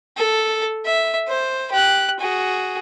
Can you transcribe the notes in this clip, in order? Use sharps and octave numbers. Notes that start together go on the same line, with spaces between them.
A4
E5
C5
G4 F#6
F#4 G#4